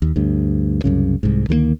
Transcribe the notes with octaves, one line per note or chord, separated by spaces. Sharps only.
D#2
D2 G2
C2 F#2 C#3
C2 G#2
D2 D#3 F3 A#3